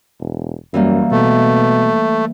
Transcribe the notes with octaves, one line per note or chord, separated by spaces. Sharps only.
E1
F#2 E3 G3 A#3
B2 A3